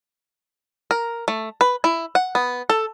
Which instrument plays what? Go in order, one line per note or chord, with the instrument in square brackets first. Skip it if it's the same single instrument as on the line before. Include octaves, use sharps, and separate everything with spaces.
[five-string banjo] A#4
A3
B4
E4
F#5
B3
A4